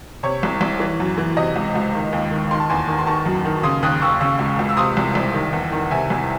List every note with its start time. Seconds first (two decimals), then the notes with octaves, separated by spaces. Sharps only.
0.23 C3 C#5
0.43 C2
0.61 C2
0.80 E3
1.00 F#2
1.18 E3
1.37 C3 D#5
1.56 C#2
1.75 C#2
1.94 D#3
2.13 D#2
2.31 D#3
2.51 D#3 C6
2.60 A5
2.70 E2 G#5 C6
2.88 D#3
2.99 C6
3.07 D#3 A5 C#6
3.26 F#2
3.45 D#3
3.63 C#3 C6 D#6
3.83 D#2 D#6 F#6
4.02 D#2 C#6 E6
4.21 C#3 C#6 E6
4.39 C#2
4.59 C#2
4.69 E6
4.77 C3 C6 D#6
4.97 C2
5.15 C2
5.34 D#3
5.52 E2
5.72 D#3
5.91 C3 E5 G#5
6.10 C2